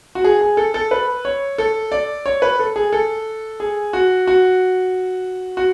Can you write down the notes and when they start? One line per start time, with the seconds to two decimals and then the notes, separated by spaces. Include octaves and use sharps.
0.15 F#4
0.24 G#4
0.41 G#4
0.57 A4
0.74 A4
0.91 B4
1.25 C#5
1.58 A4
1.92 D5
2.26 C#5
2.42 B4
2.59 A4
2.76 G#4
2.93 A4
3.60 G#4
3.93 F#4
4.27 F#4
5.57 F#4